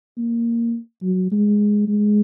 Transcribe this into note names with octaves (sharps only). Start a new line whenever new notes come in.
A#3
F#3
G#3
G#3